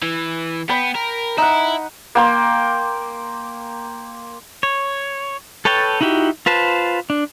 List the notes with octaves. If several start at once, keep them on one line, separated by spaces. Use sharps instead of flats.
E3
B3 G5 B5
A#4
D#4 E4 F#5
A#3 G5 C6
C#5
A4 B4 C#5 G5 A5
D#4 E4 F#4 G4
F4 B4 C5 A5
D4